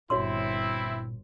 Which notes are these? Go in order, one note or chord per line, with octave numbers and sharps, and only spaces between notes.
G1 A#2 C4 E4 F#4 C#5 C6